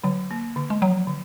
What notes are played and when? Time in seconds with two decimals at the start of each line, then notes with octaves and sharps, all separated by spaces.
0.04 D3 F#3
0.31 A#3
0.56 D3
0.70 G#3
0.82 F3 F#3
1.07 D3